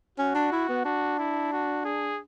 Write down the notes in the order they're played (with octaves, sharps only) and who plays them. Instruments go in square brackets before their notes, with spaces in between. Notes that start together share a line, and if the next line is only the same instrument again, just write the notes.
[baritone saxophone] C#4 [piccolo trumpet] F#4
[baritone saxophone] D4
E4
B3
[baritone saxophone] D4 [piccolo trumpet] F#4
[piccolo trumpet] E4
F#4
G#4